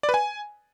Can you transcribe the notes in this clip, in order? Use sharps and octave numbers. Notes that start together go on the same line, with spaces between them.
D5
B4
G#5